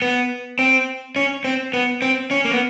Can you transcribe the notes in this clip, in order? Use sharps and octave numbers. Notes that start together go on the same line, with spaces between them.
B3
C4
C#4
C4
B3
C4
C#4
A#3
B3